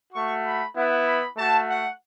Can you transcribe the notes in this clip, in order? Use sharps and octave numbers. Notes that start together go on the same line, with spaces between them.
A3 F#4 C#6
B5
B3 E4 F#5
B5
A3 F#4 A5
F#5